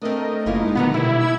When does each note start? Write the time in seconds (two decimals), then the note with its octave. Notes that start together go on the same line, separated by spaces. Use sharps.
0.02 A3 C4 D4 A#4 D#5
0.46 F#1 A#3 E4 F4
0.63 G#3 D#4
0.75 A#2 D3 D#3 F3 G3 B3 A#5
0.94 B2 G3 E4
1.18 E6 G#6